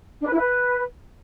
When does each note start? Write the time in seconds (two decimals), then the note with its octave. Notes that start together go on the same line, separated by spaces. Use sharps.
0.21 D4
0.27 B4
0.32 E4
0.38 B4